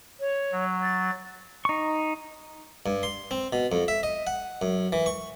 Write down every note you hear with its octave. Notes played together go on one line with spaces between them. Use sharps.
C#5
F#3
A6
D#4 C#6
G2
C6
C4
B2
F2
E5
D#5
F#5
F#2
E3
C#6